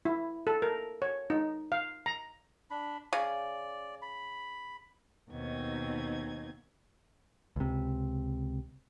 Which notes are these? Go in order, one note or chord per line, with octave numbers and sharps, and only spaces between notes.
E4
A4
A#4
C#5
D#4
F5
A#5
D4 B5
C#3 D5
B5
D#2 B2 B3 C4 D#4 G#6
C#2 C3